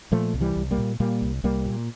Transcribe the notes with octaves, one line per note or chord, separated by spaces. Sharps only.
A#2 F3 A3
C2
E3 G3
C2
G3 A#3
A#2
A#2 G3 A#3
C2
C2 G3 A#3
A#2